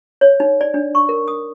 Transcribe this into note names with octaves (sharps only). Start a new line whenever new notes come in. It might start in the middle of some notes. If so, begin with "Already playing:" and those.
C#5
D#4
D5
D4
C#6
A#4
D#6